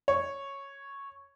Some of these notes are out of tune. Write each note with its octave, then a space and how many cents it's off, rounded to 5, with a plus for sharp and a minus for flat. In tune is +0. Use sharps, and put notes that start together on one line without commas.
C#5 -5